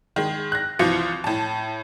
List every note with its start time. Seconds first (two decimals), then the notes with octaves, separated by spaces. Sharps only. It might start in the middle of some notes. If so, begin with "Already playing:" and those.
0.16 D#3 G#3
0.52 F#6 A#6
0.79 C2 E3 F3 F4 C#7
1.24 A2 A5